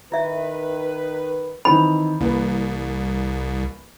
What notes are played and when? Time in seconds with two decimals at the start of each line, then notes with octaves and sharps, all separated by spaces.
0.12 D#3 E4 B4 E5
1.65 D#3 E3 C4 B5
2.20 C2 E3 A#3 B4